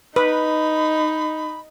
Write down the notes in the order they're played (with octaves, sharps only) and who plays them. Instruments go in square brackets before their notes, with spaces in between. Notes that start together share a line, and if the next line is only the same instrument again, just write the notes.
[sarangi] D#4 [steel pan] B4 [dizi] B5